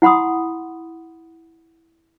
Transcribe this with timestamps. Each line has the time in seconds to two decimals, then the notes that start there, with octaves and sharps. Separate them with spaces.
0.02 E4 F#5 B5 C6 D#6